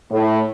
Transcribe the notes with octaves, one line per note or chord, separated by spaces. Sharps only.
A2